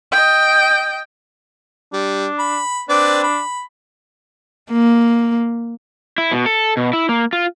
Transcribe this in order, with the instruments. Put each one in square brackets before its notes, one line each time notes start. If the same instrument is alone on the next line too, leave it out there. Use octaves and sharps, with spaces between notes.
[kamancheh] D#5 G5
[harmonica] G3 [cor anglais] D4
[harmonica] B5
[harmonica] C4 B4 D5 [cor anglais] D4
[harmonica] B5
[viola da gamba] A#3
[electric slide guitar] E4
B2
A4
B2
E4
A#3
F4